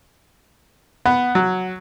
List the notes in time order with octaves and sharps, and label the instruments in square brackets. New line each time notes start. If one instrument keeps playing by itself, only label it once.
[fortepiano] B3 [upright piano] F#5
[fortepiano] F#3